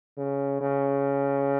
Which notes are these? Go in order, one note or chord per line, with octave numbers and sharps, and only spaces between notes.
C#3
C#3